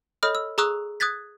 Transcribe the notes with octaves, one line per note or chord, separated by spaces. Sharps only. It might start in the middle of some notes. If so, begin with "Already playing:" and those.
A4 C#5 D#5 B5 D#6 F6
E6
G#4 A#5 C#6 D#6 E6 F#6
D#6 F#6 G#6 A6 B6